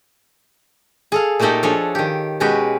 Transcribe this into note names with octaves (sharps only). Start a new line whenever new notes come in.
G#4 A4 F5
A#2 A3 A#3 D#4 G4 A4
F3 D4 G#4 A4 C#5
D#3 G4
B2 G#3 C#4 F#4 G4 B4